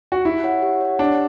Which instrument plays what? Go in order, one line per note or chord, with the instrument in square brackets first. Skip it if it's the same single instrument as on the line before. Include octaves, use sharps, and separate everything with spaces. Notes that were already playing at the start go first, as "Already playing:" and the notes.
[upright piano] F#4
[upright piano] E4 [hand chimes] G4
[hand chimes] C#5 F#5
G4
C#5 F#5
[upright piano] D4 [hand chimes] G4